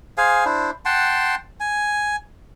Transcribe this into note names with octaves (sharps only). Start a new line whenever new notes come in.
G#4 C5 F5 G#5
D4 E4 C5
F#5 G5 A5 C6
G#5